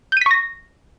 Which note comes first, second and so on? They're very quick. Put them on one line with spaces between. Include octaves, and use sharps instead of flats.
G6 D#7 B6 C#6 A#6